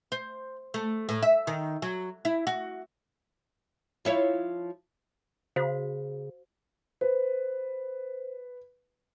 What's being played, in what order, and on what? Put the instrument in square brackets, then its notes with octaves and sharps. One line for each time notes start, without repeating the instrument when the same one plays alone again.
[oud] C5
A3
A2
E5
D#3
F#3
E4
F#4
F3 E4 C#5
[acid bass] C#3 [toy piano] F#4 C5 F5
[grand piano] B4 [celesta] C5